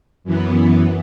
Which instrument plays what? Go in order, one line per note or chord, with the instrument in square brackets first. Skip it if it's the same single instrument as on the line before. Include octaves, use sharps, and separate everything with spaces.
[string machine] F#2 E3 B3